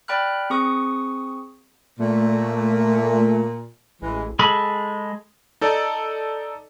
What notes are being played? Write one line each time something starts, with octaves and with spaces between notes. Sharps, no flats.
D5 G5 B5 F6 F#6
C4 G#4 C#6 D#6
A#2 A3
A1 E3 G#3
G#3 G#4 A4 B5
D#4 A4 D5